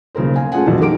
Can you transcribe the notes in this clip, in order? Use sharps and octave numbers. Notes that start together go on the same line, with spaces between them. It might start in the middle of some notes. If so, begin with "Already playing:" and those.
B1 C#3 A#3 A#4 C5
F5 G#5
A3 C#4 F4 G#4 F#5 G#5
A#1 F#2 B2 E3 F#3
F2 D#3 G4 A#4 D6 D7